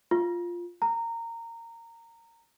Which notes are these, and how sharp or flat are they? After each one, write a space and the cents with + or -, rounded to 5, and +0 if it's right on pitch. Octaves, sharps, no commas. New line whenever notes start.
F4 +0
A#5 -20